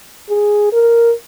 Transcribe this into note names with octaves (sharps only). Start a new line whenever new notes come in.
G#4
A#4